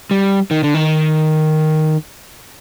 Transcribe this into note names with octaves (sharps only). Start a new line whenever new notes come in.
G3
D#3
D3
D#3